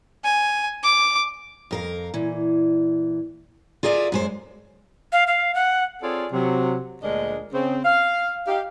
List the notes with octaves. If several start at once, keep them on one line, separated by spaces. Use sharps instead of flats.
G#5
D6
F2 A#4 F5
A#2 E3
F4 G#4 A#4 D5 E5
F#2 G#3 C5
F5
F5
F#5
C4 F4 G#4 A4 C#5 D5
C3 F#3
D2 A#2 G#3 D4 A#4 D#5
C#3 C4
F5
D#4 G4 F5